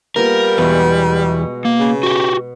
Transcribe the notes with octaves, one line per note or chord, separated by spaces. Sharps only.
G3 A#3 B3 F4 A#4
E2 B2 G#3
A#3
C#3
F#4 G4